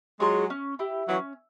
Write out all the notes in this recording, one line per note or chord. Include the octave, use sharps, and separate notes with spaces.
F#3 G#3 F4 G#4 C#5
C#4
E4 G4
E3 F#3 C#4